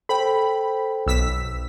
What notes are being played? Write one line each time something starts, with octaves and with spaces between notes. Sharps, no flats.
A4 C5 G5 B5
B1 E6 B6